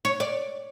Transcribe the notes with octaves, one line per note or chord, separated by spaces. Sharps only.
C#5
D5